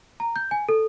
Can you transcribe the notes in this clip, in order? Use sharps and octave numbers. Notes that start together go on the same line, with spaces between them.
A#5
G6
G#5
A4